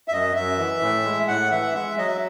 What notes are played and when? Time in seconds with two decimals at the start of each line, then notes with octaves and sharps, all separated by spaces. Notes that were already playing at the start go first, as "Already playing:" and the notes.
0.08 E5
0.12 F#2 D#5
0.35 F#2 E5
0.58 E3
0.81 A2
1.05 G#3
1.28 A2 F#5
1.51 E3 E5
1.63 F#5
1.75 G#3 E5
1.97 F#3 D#5
2.07 E5